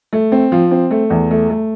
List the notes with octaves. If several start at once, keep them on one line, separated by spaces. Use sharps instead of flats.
A3
C4
F3
C4
A3
E2
A3
A3